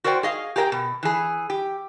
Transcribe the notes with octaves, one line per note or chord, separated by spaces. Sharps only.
F#4 A#4 C5 D5 G5
G#4 D#5 F5
G4 G#4 A#4 D#5 G5
B2
E3 G#4
G4